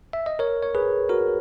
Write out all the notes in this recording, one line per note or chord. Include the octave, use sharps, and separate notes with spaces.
E5
D#5
A#4 C#5
C#5
G#4 B4
F#4 A#4